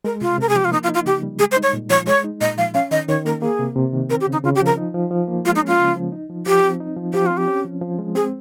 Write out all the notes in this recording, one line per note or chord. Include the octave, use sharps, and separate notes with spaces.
G#3 A#4
C3 F4
C3 A#4
G#4
F3 G4
F4
A#3 D#4
F4
D#4
F4
C#3 G4
G3
G#3 G#4
C5
D#4
C#5
A#2
F3 C#5
G#3 C#5
D#4
A#2 D#5
F3 F5
C#4 F5
D#3 D#5
D#3 C#5
A#3 A#4
A#3 G#4
C3
C3
D#3
C4 A#4
G4
C#3
D#4
C#3 F4
G4
F3
A#4
D#4
F3
F3
A#3
G#3 F4
D#4
C#4
F4
C#3
F3
D#4
F3
F3 G4
C4
D#4
F3
F3 G4
C4 F4
G4
C#4
F3
F3
G#3
C4 G#4